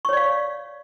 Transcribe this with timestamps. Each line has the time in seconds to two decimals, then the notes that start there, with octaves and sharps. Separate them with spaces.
0.05 C#6
0.09 C#5
0.13 D5
0.17 F5